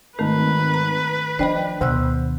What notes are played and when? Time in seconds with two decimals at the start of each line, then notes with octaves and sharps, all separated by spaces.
0.19 G#1 D#3 A3 A#4 B4
0.74 A#5
1.39 F3 D4 C5 D#5 G5 B5
1.81 D2 B2 D#3 C5 E6 F#6